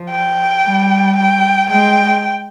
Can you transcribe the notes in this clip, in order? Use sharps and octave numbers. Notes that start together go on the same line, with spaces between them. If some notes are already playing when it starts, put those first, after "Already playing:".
Already playing: F3
G5
G3
G5
G#3 G5